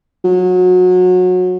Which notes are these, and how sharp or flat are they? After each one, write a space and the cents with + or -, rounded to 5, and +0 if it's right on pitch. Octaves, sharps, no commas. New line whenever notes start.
F#3 -25